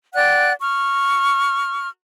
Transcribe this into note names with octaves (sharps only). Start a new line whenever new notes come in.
D5 F#5 G5 F#6
C#6 F6